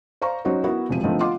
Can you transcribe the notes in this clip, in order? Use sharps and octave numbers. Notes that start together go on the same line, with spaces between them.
C5 D5 F5 A#5 C#6
F#3 C#4 D#4 F#4 C5
B3 E4 F#4 A#4
E1 C3 F3 D#7
D3 D#3 F3 A3 B3 C4
F4 D#5 F5 F#5 C6 D6